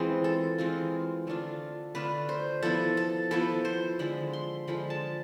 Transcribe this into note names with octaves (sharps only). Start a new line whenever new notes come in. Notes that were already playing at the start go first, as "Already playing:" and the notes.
Already playing: E3 G#3 C4 F4 G#4
A4
E3 G#3 C4 F4
D3 A3 D4 F4
D3 A3 D4 F4 B4
C5
F3 B3 E4 A4
A4
F3 B3 E4 A4
C5
D3 F3 G#3 B5
C6
D3 F3 G#3 B5
A5